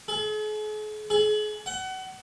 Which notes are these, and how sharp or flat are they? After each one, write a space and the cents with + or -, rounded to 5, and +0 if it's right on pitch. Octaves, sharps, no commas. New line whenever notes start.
G#4 +45
G#4 +35
F#5 +30